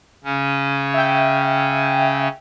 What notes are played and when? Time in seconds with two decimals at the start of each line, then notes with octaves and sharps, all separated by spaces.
0.24 C#3 C#4
0.94 E5 G5